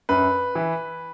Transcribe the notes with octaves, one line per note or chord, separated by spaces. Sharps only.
F#2 B4
E3